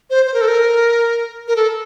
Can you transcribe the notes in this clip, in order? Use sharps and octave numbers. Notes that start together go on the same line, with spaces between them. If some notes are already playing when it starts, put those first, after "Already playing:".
C5
C5
A#4
A4
A#4
A#4
A4